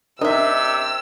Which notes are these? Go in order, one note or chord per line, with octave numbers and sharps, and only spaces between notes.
C3 D4 A#4 D#5 E5 E6